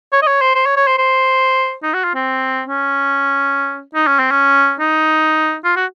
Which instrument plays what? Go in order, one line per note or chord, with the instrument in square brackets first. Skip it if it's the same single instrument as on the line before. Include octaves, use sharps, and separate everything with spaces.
[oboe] C#5
D#5
C#5
C5
C5
C#5
C#5
C5
C5
D#4
F#4
F4
C4
C#4
D#4
C#4
C4
C#4
D#4
F4
F#4